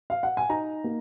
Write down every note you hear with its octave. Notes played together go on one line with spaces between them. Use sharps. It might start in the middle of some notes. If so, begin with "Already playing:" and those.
F5
F#5
G#5
D#4 A#5
A#3